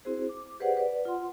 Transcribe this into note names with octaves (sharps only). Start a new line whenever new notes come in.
C4 E4 F#4 G#4 C5
D6
G4 G#4 B4 C5 D5 F#5
B4 D5
F4 F#5 C6